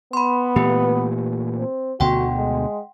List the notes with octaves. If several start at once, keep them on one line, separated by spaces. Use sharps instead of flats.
B3 B5 C6
A#2 E3 A3 G4 B4
C4
D2 B2 D3 F#4 F#5 G5 C6
G#3